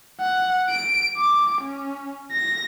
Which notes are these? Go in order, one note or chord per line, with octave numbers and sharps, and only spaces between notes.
F#5
D7
D6
C#4
A#6